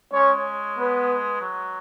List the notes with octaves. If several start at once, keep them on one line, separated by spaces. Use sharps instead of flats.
G#3 C#4 C#5
B3 B4
F#3